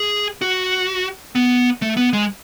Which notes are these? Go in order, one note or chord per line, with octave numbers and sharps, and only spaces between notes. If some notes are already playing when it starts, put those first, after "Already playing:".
Already playing: G#4
F#4
B3
A3
B3
G#3